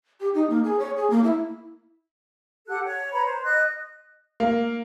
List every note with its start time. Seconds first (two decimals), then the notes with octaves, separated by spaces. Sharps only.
0.20 G4
0.34 D#4
0.50 A#3
0.64 G#4
0.79 C#5
0.97 G#4
1.10 A#3
1.23 E4
2.67 G4 A4 F#5 F#6
2.84 C#5
3.12 B4 C#5 A#5 B5
3.25 C5
3.44 D#5 F#6
4.40 A#3